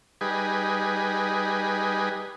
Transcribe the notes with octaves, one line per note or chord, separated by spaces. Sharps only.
G3 D#4 G#4 B4